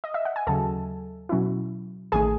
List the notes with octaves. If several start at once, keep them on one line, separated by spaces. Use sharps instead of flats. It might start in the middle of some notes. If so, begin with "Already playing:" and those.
D#5
E5
F#5
G#5
D#2 C#3 F#3 A4 A5
B2 F#3 C#4 E4
A1 D#3 A3 G#4 G#5